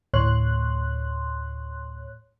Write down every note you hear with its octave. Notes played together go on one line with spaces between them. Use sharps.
D2 A2 C#5 C6 F#6